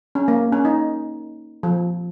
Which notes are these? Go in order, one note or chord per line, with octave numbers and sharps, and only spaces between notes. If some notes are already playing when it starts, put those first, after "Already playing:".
C#4
A#3
C#4
D#4
F3